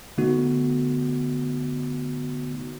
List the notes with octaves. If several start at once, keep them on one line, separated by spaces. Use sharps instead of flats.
D3 A3 B3 D#4 F#4